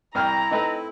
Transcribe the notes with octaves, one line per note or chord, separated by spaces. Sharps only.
C2 E4 G5 A#5 F6
A3 C4 D#4 B4